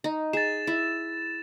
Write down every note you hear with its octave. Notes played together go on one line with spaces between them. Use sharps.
D#4
G#4 A6 E7
E4